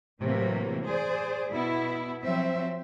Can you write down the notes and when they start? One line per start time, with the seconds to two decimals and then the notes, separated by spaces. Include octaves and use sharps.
0.21 A2 C3 E3 F#3 A#3
0.84 G#4 C5 D5
1.49 B2 B3 E4
2.24 F3 F#3 C4 E5